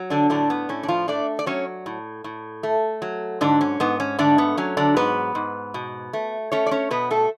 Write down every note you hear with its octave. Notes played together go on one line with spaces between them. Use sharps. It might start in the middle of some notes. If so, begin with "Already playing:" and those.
Already playing: F#3
D3 D4
A2 D3 D4
B3
A2 C#4
D4
F3 F4
A3 D4 D5
D5
F#3 C#4 C#5
A2
A2
A3
F#3
G#2 D3 D4
C#4
G#2 B3
C#4
D3 A3 D4
B3
F#3 C#4
D3 D4
G#2 B3 B4
G#2
B2
A3
A3 C#4 C#5
D5
C#4 C#5
B2 B3 B4
A3 A4